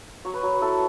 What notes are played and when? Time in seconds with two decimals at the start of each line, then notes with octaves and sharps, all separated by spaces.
0.25 F#3 C#5
0.34 B4
0.43 F#3 C#5
0.53 B4
0.61 E4 A4